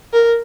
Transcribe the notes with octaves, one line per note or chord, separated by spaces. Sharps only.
A#4